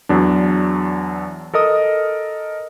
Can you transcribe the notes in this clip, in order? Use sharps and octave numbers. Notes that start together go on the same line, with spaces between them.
E2 F#3 D4
A4 A#4 D#5 D#6